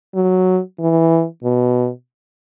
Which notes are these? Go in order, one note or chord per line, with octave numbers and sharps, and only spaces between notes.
F#3
E3
B2